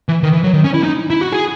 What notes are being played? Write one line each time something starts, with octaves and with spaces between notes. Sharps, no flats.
E3
D#3
E3
F#3
D#3
C#4
E4
D#4
E4
F#4
G#4